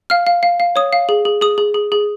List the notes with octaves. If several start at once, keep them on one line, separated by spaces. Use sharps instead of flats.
F5 F6
F5
F5
F5
C#5 D#6
F5
G#4
G#4
G#4 D#6
G#4
G#4
G#4